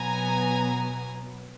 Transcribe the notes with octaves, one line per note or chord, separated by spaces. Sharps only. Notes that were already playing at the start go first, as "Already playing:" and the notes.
Already playing: B2 F#3 B3 G#5 A#5